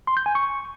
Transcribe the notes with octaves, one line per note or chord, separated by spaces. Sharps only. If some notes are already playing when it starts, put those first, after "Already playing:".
C6
G6
G#5
C#6